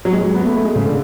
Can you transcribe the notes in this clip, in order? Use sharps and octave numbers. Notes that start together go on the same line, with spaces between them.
F#3
G#3
F#3
B3
A3
A3
G#3
C#3
D3